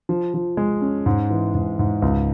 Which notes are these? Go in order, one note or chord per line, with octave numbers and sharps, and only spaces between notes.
F3
F3
G#3
C#4
G#2
E3
G#2
G#2
C#2